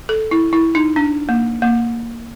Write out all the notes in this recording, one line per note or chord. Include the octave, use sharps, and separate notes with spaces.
A4
E4
E4
D#4
D4
A#3
A#3